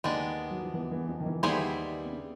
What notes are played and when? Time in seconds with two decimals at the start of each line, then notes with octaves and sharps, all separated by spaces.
0.04 D#2 D#3 G#3 B3 D4
0.50 F#3
0.62 F3
0.74 E2 E3
0.91 E2 E3
1.08 F2 F3
1.20 D#3
1.26 E2 E3
1.43 D#2 D#3 G3 B3 E4 G#4 C5
2.05 C3
2.13 C#3